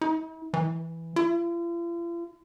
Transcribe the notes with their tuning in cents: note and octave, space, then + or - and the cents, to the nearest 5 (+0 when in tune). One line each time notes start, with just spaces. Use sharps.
E4 -45
E3 +0
F4 -45